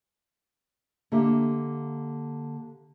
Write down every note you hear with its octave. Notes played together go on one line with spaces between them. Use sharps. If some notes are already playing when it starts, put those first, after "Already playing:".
D3 A#3 G4 E5